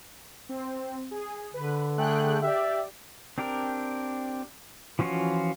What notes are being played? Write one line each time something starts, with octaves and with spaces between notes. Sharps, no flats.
C4
G#4
D3 B4
A3 G#4 G5 F#6
G4 D5 E5
C4 D4 G4 A#4
E3 F3 C#4 F4 F#4